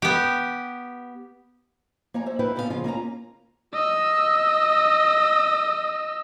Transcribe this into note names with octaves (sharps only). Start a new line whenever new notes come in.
B3 G4
A#3 C#5 G#5 A#5
C5 E5
A#3 E4 B4 E5 G5
A#2 A#3 B3 C#4 G#4 F5
C#3 F3 F4
A#3 C#4 F4 A#5
D#5 E6